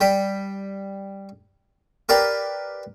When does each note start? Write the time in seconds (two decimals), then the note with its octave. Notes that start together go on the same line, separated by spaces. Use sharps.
0.01 G3 G5 B5
2.09 G4 A#4 B4 D5 F5